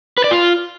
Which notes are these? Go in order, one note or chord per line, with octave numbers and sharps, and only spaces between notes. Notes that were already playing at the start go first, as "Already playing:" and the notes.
B4
D5
F4